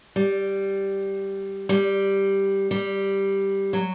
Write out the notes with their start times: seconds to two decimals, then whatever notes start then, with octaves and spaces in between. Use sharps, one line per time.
0.16 G3
1.69 G3
2.71 G3
3.73 F#3